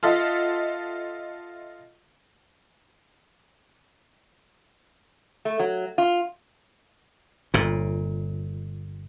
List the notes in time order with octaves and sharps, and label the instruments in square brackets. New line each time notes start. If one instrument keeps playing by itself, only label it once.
[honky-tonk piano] F4 A4 D#5 E5 F#5
[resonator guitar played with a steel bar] A3
F#3
F4
[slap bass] G1 A#2